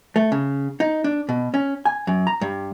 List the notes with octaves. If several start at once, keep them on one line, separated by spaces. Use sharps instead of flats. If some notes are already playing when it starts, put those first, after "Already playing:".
A3
C#3
D#4
D4
B2
C#4
G#5
F#2
A#5
G2